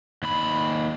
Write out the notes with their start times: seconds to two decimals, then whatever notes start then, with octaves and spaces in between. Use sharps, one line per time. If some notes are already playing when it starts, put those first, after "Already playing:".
0.23 D#2 B5